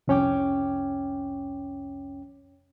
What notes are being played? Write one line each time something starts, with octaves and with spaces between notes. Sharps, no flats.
C2 F2 C#4 C#5 G5 D6